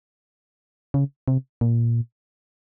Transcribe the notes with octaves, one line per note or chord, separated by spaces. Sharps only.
C#3
C3
A#2